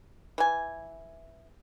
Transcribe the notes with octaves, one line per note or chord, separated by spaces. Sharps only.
E3 G#5